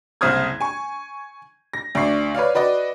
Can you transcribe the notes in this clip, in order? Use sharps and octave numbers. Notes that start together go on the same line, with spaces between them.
F#1 C2 C5 D#6 F6 G#6
G#5 C#6
A#6
D2 D5 C#6 C7
B4 C#5 D5 F5
F#4 B4 D5 D#5